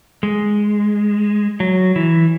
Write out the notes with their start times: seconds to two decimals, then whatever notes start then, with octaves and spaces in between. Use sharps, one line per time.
0.23 G#3
1.60 F#3
1.96 E3